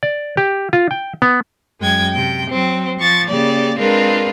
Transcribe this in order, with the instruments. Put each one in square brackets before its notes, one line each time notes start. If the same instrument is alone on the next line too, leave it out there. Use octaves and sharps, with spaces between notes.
[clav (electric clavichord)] D5
G4
F4
G5
B3
[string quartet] F#2 G#3 G5 G#6
C3 G5
F#3 C4
F3 C#6 A6
C#3 A#3 G4 D5
G#3 C4 D4 F4 A#4 B4